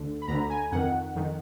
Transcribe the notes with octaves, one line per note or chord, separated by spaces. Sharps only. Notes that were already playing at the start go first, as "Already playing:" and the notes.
Already playing: D2 D3
B5
D2 D3 A#5
G#5
F2 D#3 F#5
F2 D#3